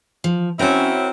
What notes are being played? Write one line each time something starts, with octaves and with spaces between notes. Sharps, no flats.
F3
C4 C#4 E4 F#4 A#4 C#5